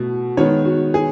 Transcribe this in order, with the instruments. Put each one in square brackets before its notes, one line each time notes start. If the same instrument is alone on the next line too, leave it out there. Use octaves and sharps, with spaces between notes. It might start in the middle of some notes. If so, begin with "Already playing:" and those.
Already playing: [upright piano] B2 A3
D#3 G#3 B3 C#5
F#4
G#4